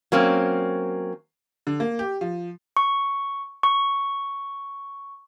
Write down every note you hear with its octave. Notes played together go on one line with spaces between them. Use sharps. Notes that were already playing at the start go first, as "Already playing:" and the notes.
F#3 A#3 C4 C#4
D3
A#3
G4
F3
C#6
C#6